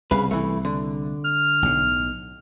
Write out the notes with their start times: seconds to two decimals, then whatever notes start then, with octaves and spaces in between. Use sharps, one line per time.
0.11 C2 C#3 B4
0.31 E3 A3
0.65 D3
1.25 F6
1.62 B1 A2